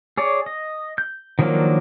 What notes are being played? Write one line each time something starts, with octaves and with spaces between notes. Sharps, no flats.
G#4 C#5 D5
D#5
G6
D#3 F3 F#3 A#3 D4